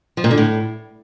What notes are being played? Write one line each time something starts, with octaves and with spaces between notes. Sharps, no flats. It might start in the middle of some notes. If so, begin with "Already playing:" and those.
F3
A#2
D3
A2